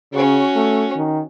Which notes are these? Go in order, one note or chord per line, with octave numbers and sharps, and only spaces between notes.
C#3 C#4 F#4
A3
D#3